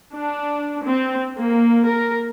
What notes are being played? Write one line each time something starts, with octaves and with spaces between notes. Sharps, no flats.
D4
C4
A#3
A#4